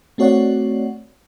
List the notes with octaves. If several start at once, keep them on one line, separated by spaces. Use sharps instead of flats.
A3 C4 F#4 C#5 D5 F#5